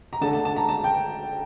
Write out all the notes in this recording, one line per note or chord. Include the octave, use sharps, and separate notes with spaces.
A#5
D3 A3 D4 A5
A5
A5
A#5
A5
G5